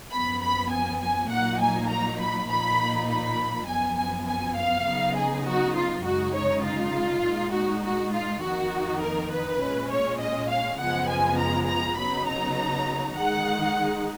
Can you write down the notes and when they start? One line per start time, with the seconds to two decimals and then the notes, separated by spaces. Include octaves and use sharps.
0.11 F#2 F3 B3 B5
0.42 B5
0.71 G#5
1.00 G#5
1.30 A#2 F#3 A#3 D#4 F#5
1.60 G#5
1.89 A#5
2.19 B5
2.48 A#2 F3 A#3 D#4 B5
3.08 B5
3.67 F#2 F3 B3 G#5
3.97 G#5
4.26 G#5
4.56 F5
4.86 C#3 F#3 B3 D#4
5.16 G#4
5.45 F#4
5.75 F4
6.04 F#2 C#3 G#3 D#4 F#4
6.34 C#5
6.63 F4
7.23 A#2 G#3 D#4
7.52 F#4
7.83 F#4
8.12 F4
8.41 F2 D#3 A#3 D#4 F#4
9.01 A#4
9.31 B4
9.60 A#2 G#3 C#4
9.90 C#5
10.19 D#5
10.49 F5
10.79 F#2 C#3 F3 G#3 B3 F#5
11.08 G#5
11.38 A#5
11.68 A#5
11.97 C#3 F#3 B3 D#4 B5
12.27 A#5
13.16 D#3 G#3 D#4 F#5